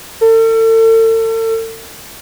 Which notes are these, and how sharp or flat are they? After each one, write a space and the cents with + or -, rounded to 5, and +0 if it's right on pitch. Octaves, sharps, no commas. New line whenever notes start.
A4 +40